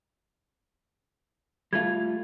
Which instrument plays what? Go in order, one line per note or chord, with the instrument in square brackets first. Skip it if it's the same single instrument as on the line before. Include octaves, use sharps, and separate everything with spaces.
[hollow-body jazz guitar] G3 A3 F4 [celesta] G#6